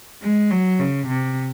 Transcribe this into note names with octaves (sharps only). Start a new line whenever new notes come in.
G#3
F#3
C#3
C3